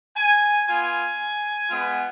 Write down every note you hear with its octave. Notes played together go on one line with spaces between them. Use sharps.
G#5
B3 F4 G#5
G#3 B3 F4